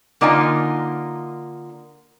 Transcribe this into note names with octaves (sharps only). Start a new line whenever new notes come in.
D3 A#3 D#4 F4 G#5